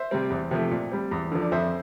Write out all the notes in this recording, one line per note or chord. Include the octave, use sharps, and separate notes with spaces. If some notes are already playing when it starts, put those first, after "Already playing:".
Already playing: C5 E5
C3 G3 C4
E2
C3 F3 A3
A#2
G3 C4
E2
D3 F3
D5
F2 C5 E5